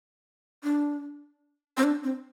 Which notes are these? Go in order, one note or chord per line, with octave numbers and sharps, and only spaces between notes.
D4
C4
D4
C4